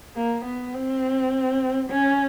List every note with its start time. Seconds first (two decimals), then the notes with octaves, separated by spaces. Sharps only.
0.16 A#3
0.45 B3
0.74 C4
1.90 C#4